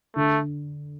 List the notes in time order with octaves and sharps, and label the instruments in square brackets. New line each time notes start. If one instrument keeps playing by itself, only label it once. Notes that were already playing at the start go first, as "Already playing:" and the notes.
[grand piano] D3 [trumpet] A3